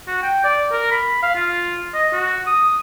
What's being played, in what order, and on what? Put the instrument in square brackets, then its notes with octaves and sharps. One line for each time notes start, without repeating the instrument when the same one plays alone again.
[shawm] F#4
G5
D5
A#4
B5
F5
F4
D#5
F#4
D#6